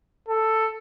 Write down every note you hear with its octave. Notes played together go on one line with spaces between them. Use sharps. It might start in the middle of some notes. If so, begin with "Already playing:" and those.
A4